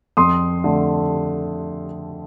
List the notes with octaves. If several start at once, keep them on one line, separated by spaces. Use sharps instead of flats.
F2 C6 D#6
D3 A3